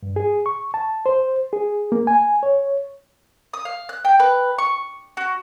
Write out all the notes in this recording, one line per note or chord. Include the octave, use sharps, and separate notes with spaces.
G2
G#4
C#6
A5
C5
G#4
A#3
G#5
C#5
D#6
F5
F#6
G5
B4
C#6
F#4